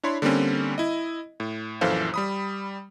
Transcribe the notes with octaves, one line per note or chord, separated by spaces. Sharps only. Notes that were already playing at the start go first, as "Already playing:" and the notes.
D4 E4 C#5 B5 C6
D3 G3 A#3 C4 C#4
E4 D#5
A2
A#1 F#2 E3 A4 C5 F5
G3 B5 D#6